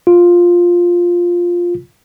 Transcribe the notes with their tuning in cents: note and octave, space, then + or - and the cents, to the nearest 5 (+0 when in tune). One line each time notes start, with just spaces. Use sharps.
F4 +5